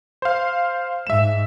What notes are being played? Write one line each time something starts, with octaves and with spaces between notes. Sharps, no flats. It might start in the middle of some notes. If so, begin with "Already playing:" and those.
C5 F5
G#2 E5 E7